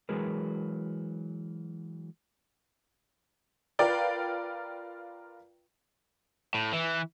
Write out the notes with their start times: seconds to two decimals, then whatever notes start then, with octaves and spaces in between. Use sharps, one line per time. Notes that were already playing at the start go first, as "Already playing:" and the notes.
0.09 E3 F#3 G#3 G#4 A#4 B4
3.79 F4 A#4 B4 D5 F5 G5
6.54 A2
6.73 E3